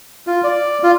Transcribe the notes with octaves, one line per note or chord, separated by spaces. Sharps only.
F4
D5
F4